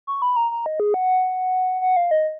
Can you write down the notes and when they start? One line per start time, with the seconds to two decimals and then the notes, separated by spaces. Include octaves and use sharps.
0.07 C#6
0.22 B5
0.36 A#5
0.51 A#5
0.66 D#5
0.80 G#4
0.94 F#5
1.81 F#5
1.96 F5
2.11 D#5